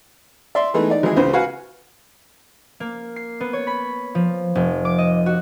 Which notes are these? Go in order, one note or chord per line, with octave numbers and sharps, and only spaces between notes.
D5 E5 C6
E3 G#3 A3 B3 D#4
D#4 D5
G#1 E3 G#3 E4 G#4
C#2 C#3 B3 C5
F#4 B4 F5 F#5 G#5
A#3
C7
B3
C#5
B5
F3
F1
D6
D#5
F#4